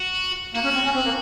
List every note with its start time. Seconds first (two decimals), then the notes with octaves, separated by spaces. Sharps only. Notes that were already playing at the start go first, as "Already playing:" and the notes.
Already playing: F#4
0.54 A#3 F#4
0.64 C#4
0.74 C4
0.85 C#4
0.95 C4
1.05 A#3